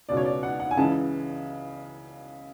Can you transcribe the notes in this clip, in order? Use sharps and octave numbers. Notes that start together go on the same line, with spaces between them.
C#2 B2 D5
C#5
D5
F#5
F#5
G#5
C#2 C#3 E3 A5